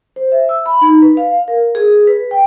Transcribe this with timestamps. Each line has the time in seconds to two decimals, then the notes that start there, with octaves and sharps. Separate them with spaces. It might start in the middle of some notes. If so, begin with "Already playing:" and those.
0.16 C5
0.32 E5
0.49 E6
0.66 B5
0.81 D#4
1.02 B4
1.17 F5
1.48 A#4
1.75 G#4
2.07 B4
2.31 G5